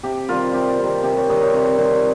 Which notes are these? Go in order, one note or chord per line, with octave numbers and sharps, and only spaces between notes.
C3 G4
D#3 G3 C4 F4
C3 G4
D#3 G3 C4
C3 G4
C#5
D#3 G3 C4 D#5
C#5
C3 C#5
D#3 G3 C4